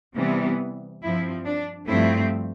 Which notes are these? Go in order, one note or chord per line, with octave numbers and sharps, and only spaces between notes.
C3 E3 G3 B3
G2 F3 C4 E4
D4
G2 F3 A3 C4 E4